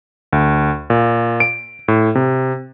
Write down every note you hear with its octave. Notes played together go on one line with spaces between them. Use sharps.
D2
A#2
D7
A2
C3